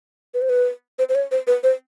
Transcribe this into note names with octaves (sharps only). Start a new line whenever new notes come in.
B4
C5
B4
C5
C5
C#5
C5
B4
C5